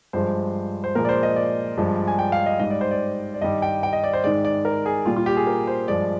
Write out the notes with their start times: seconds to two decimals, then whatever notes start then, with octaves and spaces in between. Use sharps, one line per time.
0.13 G2 F3 G#3 C5
0.84 C5
0.95 A#2 F3 G#3 A#4
1.05 D5
1.09 C5
1.23 D#5
1.36 D5
1.77 G2 F3 G#3
2.07 G#5
2.19 G5
2.32 F5
2.46 D#5
2.59 G#2 G3 D#5
2.70 D5
2.81 C5
2.91 D5
3.34 D5
3.41 G2 D#3 G3 D#5
3.62 G5
3.83 G5
3.93 D#5
4.04 D5
4.13 C5
4.24 G#2 D#3 G#3 D5
4.45 D5
4.65 A#4
4.86 G#4
5.06 A#2 G3 F4
5.16 F4
5.26 G4
5.36 G#4
5.47 A#4
5.67 C5
5.88 G2 F3 G#3 D5